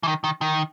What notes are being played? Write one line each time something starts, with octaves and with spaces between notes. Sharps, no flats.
E3
D#3
D#3
D#3